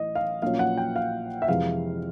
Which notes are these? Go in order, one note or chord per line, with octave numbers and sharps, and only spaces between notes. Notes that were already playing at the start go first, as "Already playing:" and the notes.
Already playing: A1 A2 E3 D#5
F5
A#1 A#2 F#3 A#3 C#4 F5
F#5
G5
F5
E5
F2 C3 E3 G#3 F5